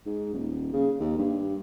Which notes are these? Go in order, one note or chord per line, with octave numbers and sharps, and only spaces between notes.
G#2
D#1
C#3
D#2
G2